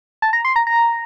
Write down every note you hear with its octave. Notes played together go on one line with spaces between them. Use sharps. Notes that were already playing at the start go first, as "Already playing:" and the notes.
A5
A#5
C6
A#5
A#5